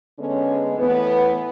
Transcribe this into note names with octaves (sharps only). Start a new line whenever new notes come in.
D3 G#3 B3 C#4
A2 E3 B3